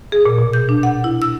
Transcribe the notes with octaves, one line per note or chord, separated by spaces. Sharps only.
G#4
A#2
B2
G6
D4
F#5
E4
E6